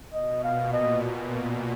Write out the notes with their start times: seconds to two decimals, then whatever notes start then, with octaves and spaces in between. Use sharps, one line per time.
0.13 B2 D#5
0.44 A#2 F5
0.73 D#5